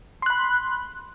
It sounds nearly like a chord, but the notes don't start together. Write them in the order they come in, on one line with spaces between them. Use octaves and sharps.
C6 F#6 B5